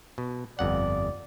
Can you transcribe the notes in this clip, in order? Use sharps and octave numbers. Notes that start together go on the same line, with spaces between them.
B2
G1 F2 D5 F#5